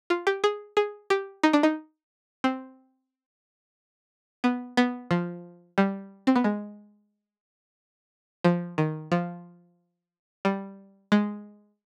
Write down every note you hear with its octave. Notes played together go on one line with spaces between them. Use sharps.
F4
G4
G#4
G#4
G4
D#4
D4
D#4
C4
B3
B3
F3
G3
C4
B3
G#3
F3
D#3
F3
G3
G#3